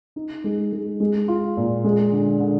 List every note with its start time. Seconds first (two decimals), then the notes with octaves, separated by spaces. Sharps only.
0.16 D#4
0.44 G#3
0.73 G#3
1.00 G#3
1.28 F4
1.57 A#2
1.84 G#3
2.12 D3
2.40 D3